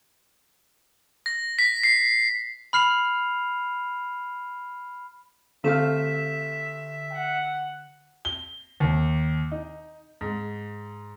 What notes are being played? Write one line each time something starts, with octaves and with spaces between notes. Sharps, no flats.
A#6
B6
C7
B5 F6 C7 F7
D3 A3 C4 E5 F5 E7
F#5
G7
D#2
D#4
G#2